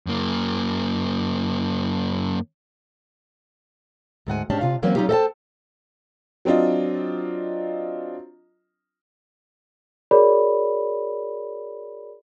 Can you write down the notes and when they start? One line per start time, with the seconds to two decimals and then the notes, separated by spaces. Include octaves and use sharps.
0.07 F#2 A#3
4.27 D2 G#2 F#5 G#5
4.50 G#2 C#4 D4 G4 A5
4.61 C3 F4 F5
4.82 E3 F#3 A#3 C4 C#4
4.96 F#3 C#4 D#4 F4 G4
5.09 A4 C5 D#5 F#5 G5 A5
6.45 F#3 C4 D4 F4 D#5
10.11 F#4 G#4 A#4 C#5 D5 B5